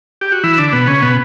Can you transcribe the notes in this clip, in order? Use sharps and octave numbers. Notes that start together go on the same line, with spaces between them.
G4
F#4
E3 E4
D3 D4
B2 B3
C#3 C#4
B2 B3